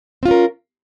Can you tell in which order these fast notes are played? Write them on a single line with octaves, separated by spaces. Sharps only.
C4 F4 C#4 A#4